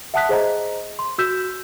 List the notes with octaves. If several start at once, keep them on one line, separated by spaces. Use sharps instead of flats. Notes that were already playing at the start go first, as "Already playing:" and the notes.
E5 F#5 A5 D#6 F#6 B6
G#4 C5 D#5 A#5
C6
F#4 E6 G6 B6 E7